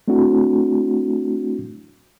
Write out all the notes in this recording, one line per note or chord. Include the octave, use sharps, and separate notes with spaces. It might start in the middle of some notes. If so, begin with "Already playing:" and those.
A3 C4 D4 E4 F#4